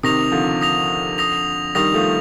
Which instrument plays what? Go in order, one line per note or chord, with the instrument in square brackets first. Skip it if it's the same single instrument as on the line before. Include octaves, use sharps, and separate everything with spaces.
[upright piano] C3 D#3 [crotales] D#6 A#6 F7
[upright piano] D3 F3
[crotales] D#6 A#6 F7
D#6 A#6 F7
[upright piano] D#3 G3 [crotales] D#6 A#6 F7
[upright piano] F3 A3